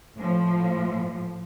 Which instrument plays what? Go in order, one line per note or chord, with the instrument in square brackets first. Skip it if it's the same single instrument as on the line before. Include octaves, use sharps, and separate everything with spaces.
[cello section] A2 F3